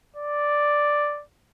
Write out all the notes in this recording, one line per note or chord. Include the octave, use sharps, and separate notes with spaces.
D5